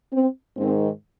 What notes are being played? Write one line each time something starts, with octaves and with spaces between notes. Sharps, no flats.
C4
G#2 D#3 C4